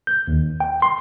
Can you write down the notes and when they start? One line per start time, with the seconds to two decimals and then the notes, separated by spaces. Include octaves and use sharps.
0.07 G6
0.28 D#2
0.60 G5
0.82 C6